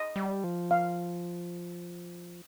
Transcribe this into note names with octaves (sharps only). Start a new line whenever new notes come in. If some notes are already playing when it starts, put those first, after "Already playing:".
Already playing: D#5
G3
F3
F5